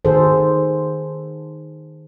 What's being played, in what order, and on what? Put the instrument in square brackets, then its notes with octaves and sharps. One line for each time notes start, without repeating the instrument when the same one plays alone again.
[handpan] D#3 F#4 G#4 A4 C5